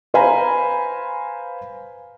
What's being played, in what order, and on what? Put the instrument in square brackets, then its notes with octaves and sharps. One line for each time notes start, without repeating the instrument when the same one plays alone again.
[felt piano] B4 C5 F5 G#5 A#5 B5